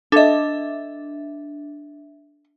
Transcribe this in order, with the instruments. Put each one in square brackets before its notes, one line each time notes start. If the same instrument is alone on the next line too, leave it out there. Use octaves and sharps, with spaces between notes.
[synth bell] D4 E5 [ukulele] A4 D#5